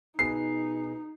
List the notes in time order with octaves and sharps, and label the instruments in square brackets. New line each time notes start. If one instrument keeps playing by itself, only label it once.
[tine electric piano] B2 G#4 B4 [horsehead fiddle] D#4 [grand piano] C7